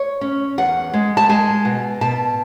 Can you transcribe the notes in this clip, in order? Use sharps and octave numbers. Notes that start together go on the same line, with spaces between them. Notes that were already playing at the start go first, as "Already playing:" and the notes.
Already playing: C#5
C#4
E2 F#5
G#3
A5
G#3 G#5
B2
B2 A5